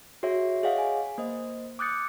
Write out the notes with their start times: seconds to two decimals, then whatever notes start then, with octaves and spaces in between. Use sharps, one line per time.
0.23 F#4 G#4 C#5 E5
0.63 G#4 C#5 D#5 F5 F#5
0.78 G#5
1.18 A#3 C5 D#5
1.79 D6 D#6 F#6 G6 A6 C#7